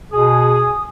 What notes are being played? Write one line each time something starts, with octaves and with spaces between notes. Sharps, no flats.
B2 G#4 D#6